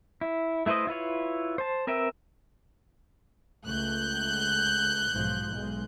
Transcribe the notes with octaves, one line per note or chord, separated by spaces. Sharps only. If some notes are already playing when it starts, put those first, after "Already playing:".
E4
A3 E4 B4 C5 D#5
E4 F4 B4 C#5
C5 A5
C4 A#4 B4 E5 G5
C#2 A3 F#6 G6
B1 G#2 F3
B1 G#3